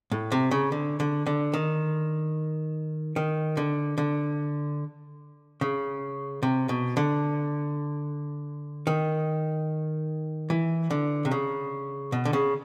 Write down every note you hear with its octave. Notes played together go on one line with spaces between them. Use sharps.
A2
C3
C#3
D3
D3
D3
D#3
D#3
D3
D3
C#3
C3
B2
D3
D#3
E3
D3
C3
C#3
B2
D3
C#3